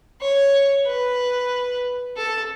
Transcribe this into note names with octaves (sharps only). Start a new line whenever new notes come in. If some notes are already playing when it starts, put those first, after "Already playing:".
C#5
B4
A4